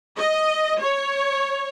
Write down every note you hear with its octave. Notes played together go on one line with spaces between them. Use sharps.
D#5
C#5